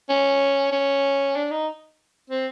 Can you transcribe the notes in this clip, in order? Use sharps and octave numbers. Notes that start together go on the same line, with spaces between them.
C#4
C#4
D4
D#4
C4